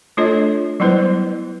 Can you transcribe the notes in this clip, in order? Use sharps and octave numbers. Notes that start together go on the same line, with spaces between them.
A3 D4 F4 A4 C#5 D#5
F#3 G3 B3 E4 B4 C5